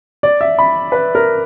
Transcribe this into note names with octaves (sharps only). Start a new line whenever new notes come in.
D5
E5
B5
B4
A#4